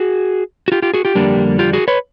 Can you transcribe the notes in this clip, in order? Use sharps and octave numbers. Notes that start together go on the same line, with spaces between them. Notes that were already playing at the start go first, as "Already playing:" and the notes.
Already playing: F#4 G#4
F#4
F4 G4
F4 G4
F#4 G#4
F4 G4
F2 D3 G3 A#3 D4
F4 G4
F#4 G#4
B4 C#5